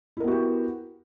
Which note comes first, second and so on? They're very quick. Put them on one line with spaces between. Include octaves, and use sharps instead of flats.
E4 A#4 B3 F#4 G4